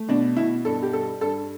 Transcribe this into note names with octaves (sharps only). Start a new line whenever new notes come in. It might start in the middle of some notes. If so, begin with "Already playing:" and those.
Already playing: A3
B2 D4
B2 E4
G2 A4
G4
G3 A4
G2 A4